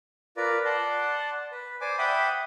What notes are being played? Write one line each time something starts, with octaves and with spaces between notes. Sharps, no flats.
F4 A#4 B4 D5
D5 F#5 A5 C6
B4
C5 D5 G#5 D6
E5 F#5 G5 B5 D6 D#6